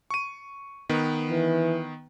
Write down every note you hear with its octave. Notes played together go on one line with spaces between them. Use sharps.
C#6 D#7
D#3 B3 B4
E3